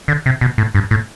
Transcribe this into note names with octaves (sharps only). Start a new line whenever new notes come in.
D3
C3
B2
A2
G2
A2